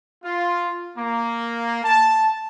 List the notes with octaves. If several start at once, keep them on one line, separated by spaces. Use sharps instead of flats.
F4
A#3
A5